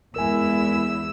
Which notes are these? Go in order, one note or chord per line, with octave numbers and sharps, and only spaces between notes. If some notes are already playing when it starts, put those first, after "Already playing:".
E2 G#3 E4 A#4 G#5 E6